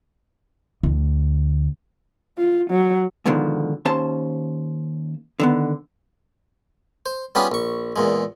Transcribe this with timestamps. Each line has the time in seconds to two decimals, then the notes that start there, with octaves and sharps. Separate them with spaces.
0.83 D2
2.38 F4
2.70 F#3
3.25 G#2 B2 D3 D#3 F3
3.85 D#2 C#4 C5 A5
5.40 D3 D#3 B3
7.06 C5
7.35 G3 B3 C#4 F4 G4 G#4
7.52 A#1 C#6
7.96 E2 A#2 G#3